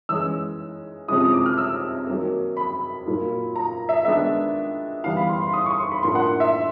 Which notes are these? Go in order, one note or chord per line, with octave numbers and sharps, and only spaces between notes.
E3 G#3 C#4 E6
C3 F3 G#3 C#4 E4 D#6
D#6
D6
F6
E6
D#3 F#3 A#3
B5
A#2 F#3 A#3
A#5
E5
D#3 G#3 B3 D4 E5
E3 G3 B3 E4 F5
B5
C6
C6
D#6
C#6
C6
B5
A2 F3 A#3 D4 C6
F#5
E5